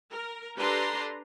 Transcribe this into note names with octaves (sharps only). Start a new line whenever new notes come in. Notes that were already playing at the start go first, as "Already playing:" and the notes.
A#4
D4 G4 A4 B4 A#5 C6